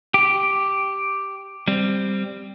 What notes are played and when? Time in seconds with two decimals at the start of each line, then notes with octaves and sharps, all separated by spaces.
0.14 G4
1.68 G3 C4